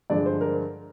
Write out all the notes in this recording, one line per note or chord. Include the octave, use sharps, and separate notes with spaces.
G2 D3 F3 G#3 D5
C5
A#4